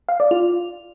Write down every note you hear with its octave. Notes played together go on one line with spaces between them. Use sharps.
F5
D5
F4